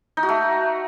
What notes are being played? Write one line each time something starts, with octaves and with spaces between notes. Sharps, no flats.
D#4
F#4
A3